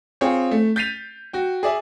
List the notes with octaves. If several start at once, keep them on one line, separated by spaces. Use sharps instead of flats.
C4 F4 G#4 C#5
A3
G6 A6 B6 C7 D#7 F7
F#4 G5
G#4 D5 E5